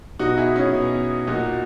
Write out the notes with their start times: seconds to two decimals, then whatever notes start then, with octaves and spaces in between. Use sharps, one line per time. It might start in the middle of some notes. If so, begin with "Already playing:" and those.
0.19 B2 D#4 F#4
0.37 E4 G#4
0.55 C#4 E4
0.73 B2
1.27 A#2 D#4 F#4